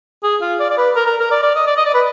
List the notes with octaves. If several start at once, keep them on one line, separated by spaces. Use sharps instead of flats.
G#4
F4
D5
D5
B4
A#4
A#4
A#4
D5
D5
D#5
D5
D#5
D5
B4